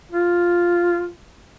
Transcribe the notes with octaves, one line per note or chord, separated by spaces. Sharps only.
F4